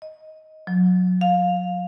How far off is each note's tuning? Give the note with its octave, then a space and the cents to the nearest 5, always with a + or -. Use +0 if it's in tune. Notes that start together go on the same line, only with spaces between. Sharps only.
D#5 +10
F#3 -25
F5 +15